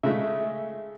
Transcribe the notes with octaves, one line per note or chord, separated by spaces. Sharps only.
C#3 G#3 A3 E5